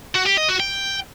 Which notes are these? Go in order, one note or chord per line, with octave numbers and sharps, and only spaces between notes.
F#4
G4
D#5
F#4
G5